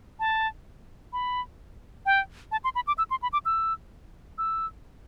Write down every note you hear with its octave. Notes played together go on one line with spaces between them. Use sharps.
A5
B5
G5
A5
C6
B5
D6
E6
C6
B5
D6
E6
E6